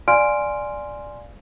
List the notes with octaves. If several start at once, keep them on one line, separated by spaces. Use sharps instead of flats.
D5 F5 G#5 C6 F6 D7